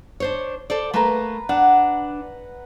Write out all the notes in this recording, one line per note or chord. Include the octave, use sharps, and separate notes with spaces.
D4 C5 C#5
A4 C5 D5
A3 A#3 B4 A#5
D4 F#5